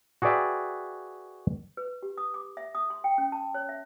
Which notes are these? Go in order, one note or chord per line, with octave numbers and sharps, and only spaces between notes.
F#4 G#4 B4 D5 E5 G5
B4
G4
D#6
D6
E5
D#6
C6
G5
C#4
A5
C#5
E5